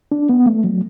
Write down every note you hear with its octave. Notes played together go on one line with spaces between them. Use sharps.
D4
B3
A3
F#3